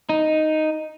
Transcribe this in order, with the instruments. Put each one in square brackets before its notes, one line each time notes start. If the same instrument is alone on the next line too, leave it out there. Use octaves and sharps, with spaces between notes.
[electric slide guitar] D#4